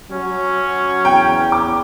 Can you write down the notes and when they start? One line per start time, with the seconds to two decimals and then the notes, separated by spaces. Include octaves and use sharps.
0.11 F#3 C#4
1.05 E2 G5
1.52 D6